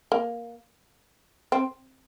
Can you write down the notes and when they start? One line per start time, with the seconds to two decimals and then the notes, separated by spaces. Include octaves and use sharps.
0.12 A#3
1.52 C4